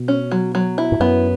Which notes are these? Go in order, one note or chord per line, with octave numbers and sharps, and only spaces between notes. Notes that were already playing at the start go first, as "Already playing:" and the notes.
Already playing: B2
C#4
F#3
F#3
E4
A2
F#2 B3